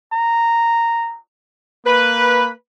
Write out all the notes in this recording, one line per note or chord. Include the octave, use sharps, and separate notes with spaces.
A#5
A#3 B4